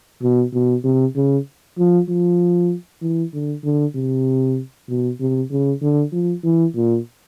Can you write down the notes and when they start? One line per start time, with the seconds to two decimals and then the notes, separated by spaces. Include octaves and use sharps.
0.22 B2
0.54 B2
0.84 C3
1.16 C#3
1.78 F3
2.09 F3
3.02 E3
3.33 D3
3.64 D3
3.95 C3
4.89 B2
5.20 C3
5.51 C#3
5.82 D3
6.13 F3
6.44 E3
6.76 A#2